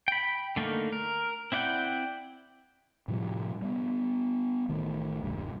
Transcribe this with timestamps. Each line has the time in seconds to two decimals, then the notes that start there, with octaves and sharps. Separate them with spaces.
0.08 G5 B5
0.56 D3 A3 A#3 D#4
0.92 A#4
1.52 C4 E4 D5 F#5 G5
3.08 A2 C3 F3 G3
3.62 G3 B3
4.69 A1 D#3 A3
5.23 D#1 C2 G2